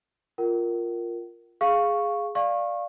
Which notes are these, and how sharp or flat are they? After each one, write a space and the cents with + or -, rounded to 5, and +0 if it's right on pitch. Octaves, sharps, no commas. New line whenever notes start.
F4 +0 A#4 +0 F#5 +45
G#4 +0 F5 +0 C#6 +0
D5 +0 F5 +0 C#6 -25